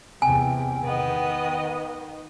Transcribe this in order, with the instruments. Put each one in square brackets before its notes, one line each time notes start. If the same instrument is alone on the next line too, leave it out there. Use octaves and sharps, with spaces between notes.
[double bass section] E2 C3 [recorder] G5 [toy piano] G#5
[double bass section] D#3 [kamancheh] B3 D#5